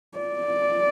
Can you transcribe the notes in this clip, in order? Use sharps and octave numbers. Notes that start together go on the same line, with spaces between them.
D5